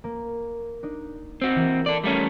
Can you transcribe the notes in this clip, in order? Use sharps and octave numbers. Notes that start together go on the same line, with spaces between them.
A#3
D4 D#4
C4 F#4
E3 A#3
A4 D5
G3 A3 C#4 F#5 A#5 G6